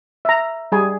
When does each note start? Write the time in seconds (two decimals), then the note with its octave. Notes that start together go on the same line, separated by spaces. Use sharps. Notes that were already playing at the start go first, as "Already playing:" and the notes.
0.25 E5 A#5
0.72 G3 G#4 G#5